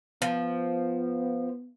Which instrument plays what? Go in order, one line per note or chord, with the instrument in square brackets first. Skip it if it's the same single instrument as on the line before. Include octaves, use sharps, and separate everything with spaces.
[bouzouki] F3 [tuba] B3